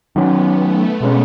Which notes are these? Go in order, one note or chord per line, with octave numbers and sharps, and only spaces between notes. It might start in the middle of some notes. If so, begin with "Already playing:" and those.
D#3 F#3 B3 C#4
A3
B2 G#3 C#4